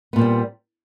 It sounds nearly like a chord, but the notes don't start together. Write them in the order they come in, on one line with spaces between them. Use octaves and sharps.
B3 A#2 C4 G3